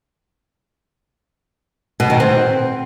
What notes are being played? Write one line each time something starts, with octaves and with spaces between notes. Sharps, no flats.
B2
D#3
C4